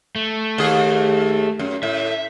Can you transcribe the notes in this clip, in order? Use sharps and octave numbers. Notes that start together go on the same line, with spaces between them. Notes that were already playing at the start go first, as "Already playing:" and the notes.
A3
D#2 G#4
F#2
A2 E5